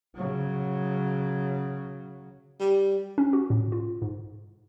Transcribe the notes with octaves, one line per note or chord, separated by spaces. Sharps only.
C#3 F#3
G3
C#4
F#4
A2
F4
G#2